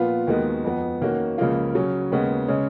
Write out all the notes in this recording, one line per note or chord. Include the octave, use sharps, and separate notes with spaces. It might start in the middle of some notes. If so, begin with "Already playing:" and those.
Already playing: A#2 F3 B3 F4 B4
D#2 D#3 G#3 B3 F#4
F2 F3 B3
D#3 A#3 C#4 F#4
C#2 C#3 F3 A#3 F4
C#3 F#3 C#4
D#2 C#3 G#3 B3
C#3 G#3 C#4